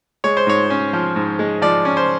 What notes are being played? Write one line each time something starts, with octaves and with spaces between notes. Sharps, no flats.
G#3 C#5
C5
G#2 C#5
C#4
F3
G#2
G#3
F3 D5
C#4
C5